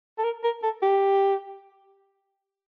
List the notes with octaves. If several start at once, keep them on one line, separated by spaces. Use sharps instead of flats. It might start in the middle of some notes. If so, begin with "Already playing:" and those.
A4
A#4
A#4
A4
G4